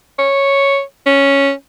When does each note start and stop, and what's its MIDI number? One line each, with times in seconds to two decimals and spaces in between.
0.19 0.81 73
1.06 1.51 61